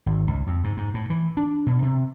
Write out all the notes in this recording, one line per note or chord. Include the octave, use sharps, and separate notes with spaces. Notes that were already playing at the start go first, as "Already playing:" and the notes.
G#1
C#2
F2
G#2
G#2
A2
E3
D4
B2
C3